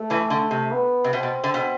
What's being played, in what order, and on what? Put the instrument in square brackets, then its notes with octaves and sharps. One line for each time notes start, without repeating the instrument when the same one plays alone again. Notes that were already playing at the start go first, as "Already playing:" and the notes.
Already playing: [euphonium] A3
[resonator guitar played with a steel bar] E2 E3
D3
C3
[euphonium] B3
[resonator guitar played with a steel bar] C3
[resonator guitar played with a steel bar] B2 [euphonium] C4
[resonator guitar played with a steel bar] B2
D3
B2